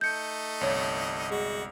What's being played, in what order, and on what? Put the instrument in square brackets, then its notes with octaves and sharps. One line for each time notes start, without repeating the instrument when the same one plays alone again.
[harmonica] A3 D#4 [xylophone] G6 C#7
[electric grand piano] G1 C2 [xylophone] C#5 D5
[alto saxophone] G#3 [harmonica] F#4